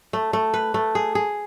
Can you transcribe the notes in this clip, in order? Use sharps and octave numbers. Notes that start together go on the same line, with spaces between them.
A3
A3
B4
A3
G#4
G#4